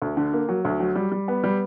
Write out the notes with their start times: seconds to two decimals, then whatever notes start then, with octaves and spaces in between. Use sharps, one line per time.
0.02 D2
0.17 D3
0.33 A#3
0.49 F#3
0.65 D2
0.80 F#3
0.96 G3
1.12 G3
1.28 B3
1.44 G3